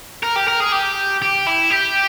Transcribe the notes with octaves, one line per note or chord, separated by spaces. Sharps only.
A#4
G4
A#4
G#4
G4
G4
E4
G4